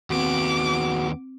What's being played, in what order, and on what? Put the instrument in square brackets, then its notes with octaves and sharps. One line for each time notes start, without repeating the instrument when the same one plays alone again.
[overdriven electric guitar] D#2 B3 [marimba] C4 [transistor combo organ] F#4 [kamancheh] D6